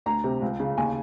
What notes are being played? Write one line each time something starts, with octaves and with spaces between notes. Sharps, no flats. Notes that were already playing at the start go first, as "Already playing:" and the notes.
D2 A#5
C3
C#2
C#3
D#2 G#5